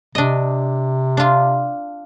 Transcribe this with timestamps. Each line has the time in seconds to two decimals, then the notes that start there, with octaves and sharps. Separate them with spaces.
0.15 C3 D4 D#5
1.17 D4 F4